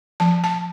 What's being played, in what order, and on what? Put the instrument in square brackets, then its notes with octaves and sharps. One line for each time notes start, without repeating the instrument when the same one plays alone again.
[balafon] F3 A5
A5